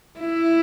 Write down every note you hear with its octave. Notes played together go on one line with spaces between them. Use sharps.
E4